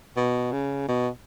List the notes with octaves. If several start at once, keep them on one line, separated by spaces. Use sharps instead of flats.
B2
C#3
B2